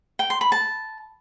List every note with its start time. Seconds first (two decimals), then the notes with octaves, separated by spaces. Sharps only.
0.19 G5
0.30 C6
0.41 B5
0.52 A5